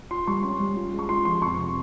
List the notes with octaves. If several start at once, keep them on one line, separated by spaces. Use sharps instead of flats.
F4 C6
G3 C#6
C#4 C6
G3
F4
G#3
C#6
F4 C6
F3 C6
F2 C#6
C3 C6